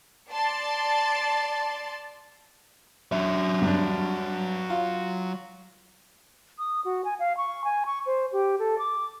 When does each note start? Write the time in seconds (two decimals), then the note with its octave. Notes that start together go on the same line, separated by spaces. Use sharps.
0.33 D5 A5 C6
3.12 F#3 E5
3.61 G2 D4
4.70 F4
6.59 D#6
6.85 F#4
7.05 G#5
7.20 F5
7.37 C#6
7.64 G#5
7.86 C#6
8.06 C5
8.33 G4
8.59 A4
8.79 D6